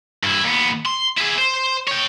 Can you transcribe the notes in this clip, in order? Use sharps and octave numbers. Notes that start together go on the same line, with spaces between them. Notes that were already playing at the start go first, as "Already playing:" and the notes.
G2 E4
D#2 B3
C6
E4 G#4
C5
C#5 G5